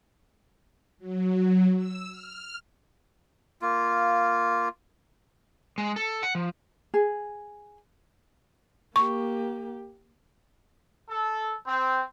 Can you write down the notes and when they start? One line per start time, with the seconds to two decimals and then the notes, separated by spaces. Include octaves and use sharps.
0.99 F#3
1.76 E6
2.09 F6
3.61 A#3 F4
5.78 G#3
5.96 A4
6.23 F#5
6.35 F3
6.94 G#4
8.96 A#3 G4 C#6
11.09 A4
11.67 C4